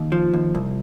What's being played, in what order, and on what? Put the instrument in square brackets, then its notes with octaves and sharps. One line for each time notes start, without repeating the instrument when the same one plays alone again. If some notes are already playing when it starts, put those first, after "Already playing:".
Already playing: [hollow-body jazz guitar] D#2
F3
D#2
C2